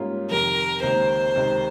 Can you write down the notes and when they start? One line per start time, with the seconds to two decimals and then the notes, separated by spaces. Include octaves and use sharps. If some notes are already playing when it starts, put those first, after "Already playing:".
Already playing: G#2 G3 A#3 C#4 F4
0.30 F2 C3 D#3 A#4
0.83 C#2 C3 D#3 A#3 C5
1.36 C#2 C3 D#3